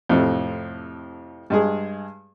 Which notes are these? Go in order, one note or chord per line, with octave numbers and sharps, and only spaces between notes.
F2 A2 C3
G2 G#3 G#4